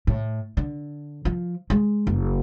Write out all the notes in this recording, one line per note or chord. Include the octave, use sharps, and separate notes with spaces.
A2
D3
F3
G#3
F#1